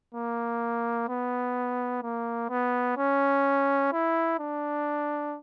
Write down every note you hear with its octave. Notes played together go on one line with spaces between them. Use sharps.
A#3
B3
A#3
B3
C#4
E4
D4